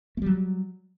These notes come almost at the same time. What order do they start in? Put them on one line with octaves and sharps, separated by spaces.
A3 G3 F#3